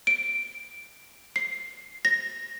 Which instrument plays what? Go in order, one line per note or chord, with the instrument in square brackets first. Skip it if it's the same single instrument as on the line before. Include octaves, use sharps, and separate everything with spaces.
[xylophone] D7
C7
A#6